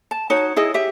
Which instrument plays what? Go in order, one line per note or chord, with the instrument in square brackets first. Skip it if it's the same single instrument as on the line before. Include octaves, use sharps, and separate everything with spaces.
[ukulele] A5
D#4 F#4 C#5
E4 G#4 D#5
G4 E5